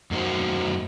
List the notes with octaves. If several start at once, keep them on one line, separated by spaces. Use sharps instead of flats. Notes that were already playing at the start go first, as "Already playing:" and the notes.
F#2 A#3 D#4 F#4 C5